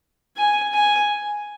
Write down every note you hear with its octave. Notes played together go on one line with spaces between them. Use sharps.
G#5
G#5